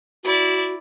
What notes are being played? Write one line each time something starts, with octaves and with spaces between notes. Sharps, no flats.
E4 F#4 D5